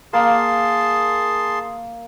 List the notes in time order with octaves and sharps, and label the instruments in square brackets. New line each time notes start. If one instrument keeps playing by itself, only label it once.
[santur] A#3 [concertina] G#4 A5 C6